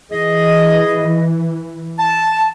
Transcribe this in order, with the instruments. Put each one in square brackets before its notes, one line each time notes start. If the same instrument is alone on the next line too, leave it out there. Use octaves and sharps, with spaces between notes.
[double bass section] E3 [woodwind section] G#4 D#5
[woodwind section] A5